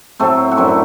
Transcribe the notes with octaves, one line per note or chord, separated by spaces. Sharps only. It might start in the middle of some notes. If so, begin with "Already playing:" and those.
A2 F#3 A3 C4
F#4
F#2 D3 F#3 C4 E4